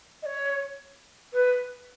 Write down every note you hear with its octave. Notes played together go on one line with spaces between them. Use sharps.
D#5
C#5
B4